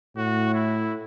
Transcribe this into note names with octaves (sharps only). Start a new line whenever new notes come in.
A2 F#4
E4